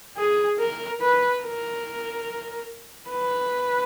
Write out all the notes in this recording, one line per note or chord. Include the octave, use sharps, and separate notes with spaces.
G#4
A#4
B4
A#4
B4